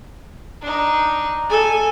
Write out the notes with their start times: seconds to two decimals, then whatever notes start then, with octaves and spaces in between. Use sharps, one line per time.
0.61 D4 D#4
1.49 A4 G#5